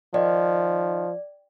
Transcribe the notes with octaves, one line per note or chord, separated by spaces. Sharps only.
D#3 F3 D5